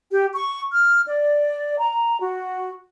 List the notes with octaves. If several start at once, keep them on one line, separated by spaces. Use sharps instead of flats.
G4
C#6
F6
D5
A#5
F#4